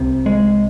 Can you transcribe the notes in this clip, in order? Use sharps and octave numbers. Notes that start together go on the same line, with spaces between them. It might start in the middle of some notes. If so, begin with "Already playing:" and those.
Already playing: C2 C3
G#3